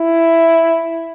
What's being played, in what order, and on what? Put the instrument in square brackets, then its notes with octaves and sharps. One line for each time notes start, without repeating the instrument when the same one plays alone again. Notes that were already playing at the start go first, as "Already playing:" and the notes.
Already playing: [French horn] E4